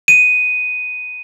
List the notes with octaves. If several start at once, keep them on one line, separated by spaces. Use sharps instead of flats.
D#7